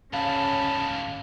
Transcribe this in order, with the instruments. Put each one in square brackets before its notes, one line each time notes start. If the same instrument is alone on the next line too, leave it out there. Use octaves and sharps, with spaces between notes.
[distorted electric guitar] D2 G#2 [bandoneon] C#3 A5 B5 [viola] C#4 [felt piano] F5